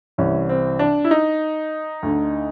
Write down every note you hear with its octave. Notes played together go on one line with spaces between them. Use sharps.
C2 C3 E3 C#4
C4
D4
E4
D#4
D2 D3